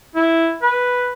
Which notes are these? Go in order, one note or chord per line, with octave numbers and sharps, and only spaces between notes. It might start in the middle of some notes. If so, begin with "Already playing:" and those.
E4
B4